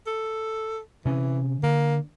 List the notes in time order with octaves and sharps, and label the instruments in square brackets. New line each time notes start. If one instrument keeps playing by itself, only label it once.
[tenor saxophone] A4
[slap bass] C3 C#4 [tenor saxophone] E3
[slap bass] D3 [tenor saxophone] A#3